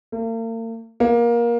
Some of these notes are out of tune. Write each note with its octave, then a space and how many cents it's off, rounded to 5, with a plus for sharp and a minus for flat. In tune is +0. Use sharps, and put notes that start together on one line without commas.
A#3 -45
A#3 +20